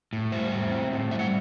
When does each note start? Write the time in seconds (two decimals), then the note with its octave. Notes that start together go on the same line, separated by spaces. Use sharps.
0.13 A2
0.32 G3 C5 E5
0.53 A2
0.72 C4
0.92 A2
1.11 G3 E5
1.19 F#5